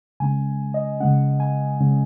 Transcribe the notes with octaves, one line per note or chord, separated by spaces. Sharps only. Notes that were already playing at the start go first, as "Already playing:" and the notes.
C#3 G#3 C#4 G#5
D#5
C#3 G#3 C#4 F#5
G#5
C#3 G#3 C#4